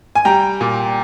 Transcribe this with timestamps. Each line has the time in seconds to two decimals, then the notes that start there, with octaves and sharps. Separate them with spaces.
0.15 G#5
0.25 G3 G5 A#5
0.61 A#2